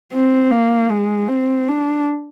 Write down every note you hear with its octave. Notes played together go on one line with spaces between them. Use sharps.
C4
A#3
G#3
C4
D4